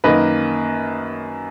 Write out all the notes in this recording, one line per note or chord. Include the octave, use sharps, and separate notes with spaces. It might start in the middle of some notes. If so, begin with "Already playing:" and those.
F#2 D#3 A#3 B4 D#5